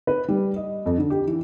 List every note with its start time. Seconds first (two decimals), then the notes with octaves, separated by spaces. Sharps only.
0.07 B4
0.28 G3
0.56 D#5
0.86 F2
0.98 D3
1.10 G4
1.27 E3